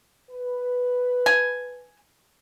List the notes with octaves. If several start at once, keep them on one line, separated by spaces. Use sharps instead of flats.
B4
G#5